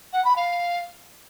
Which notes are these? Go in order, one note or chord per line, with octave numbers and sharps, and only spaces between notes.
F#5
B5
F5